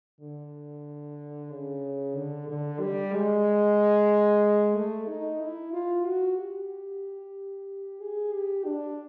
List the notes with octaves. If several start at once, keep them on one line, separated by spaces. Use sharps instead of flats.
D3
C#3
D3
D3
G3
G#3
A3
D#4
E4
F4
F#4
G4
G#4
G4
D4